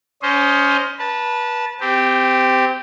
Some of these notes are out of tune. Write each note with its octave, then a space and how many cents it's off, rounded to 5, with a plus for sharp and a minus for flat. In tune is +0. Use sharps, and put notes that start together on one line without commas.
C#4 +25 C5 +0 D#5 +0
B4 -25 A5 +0
C4 -25 G4 +0